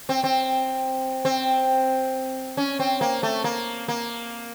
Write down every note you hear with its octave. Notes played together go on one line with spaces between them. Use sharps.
C4
C4
C4
C#4
C4
A#3
A3
A#3
A#3